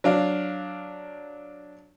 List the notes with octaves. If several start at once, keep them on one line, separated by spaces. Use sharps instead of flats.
F#3 D4 F5